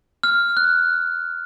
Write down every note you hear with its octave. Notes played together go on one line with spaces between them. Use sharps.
F6
F#6